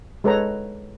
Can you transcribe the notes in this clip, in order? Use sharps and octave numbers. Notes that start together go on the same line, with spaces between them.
G#3 A4 B4 C#5 A#5